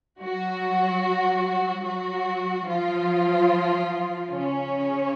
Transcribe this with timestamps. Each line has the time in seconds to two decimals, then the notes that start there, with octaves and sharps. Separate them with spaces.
0.21 F#3 F#4
1.85 F#3 F#4
2.67 F3 F4
4.31 C#3 C#4